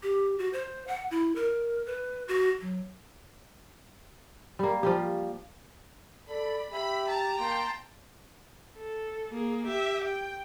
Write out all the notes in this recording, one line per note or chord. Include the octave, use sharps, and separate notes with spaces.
G4
F#4
C5
F#5
E4
A#4
B4
F#4
F#3
G3 A#3
F3 G3 G4
A4 D5 B5
G4 E5 B5
A5 A#5
A#3 G5 A5 C6
A4
A#3 G#4
G4 E5
G5